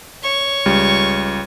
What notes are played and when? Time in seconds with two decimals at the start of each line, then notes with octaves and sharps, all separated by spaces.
0.23 C#5 C#6
0.66 C#2 G3